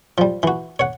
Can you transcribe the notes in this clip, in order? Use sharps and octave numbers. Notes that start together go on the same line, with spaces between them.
F3 G3
E3 F#4
C#5 F#5